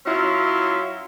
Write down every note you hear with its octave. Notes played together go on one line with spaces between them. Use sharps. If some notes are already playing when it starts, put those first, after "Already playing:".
F#3 C#4 E4 F4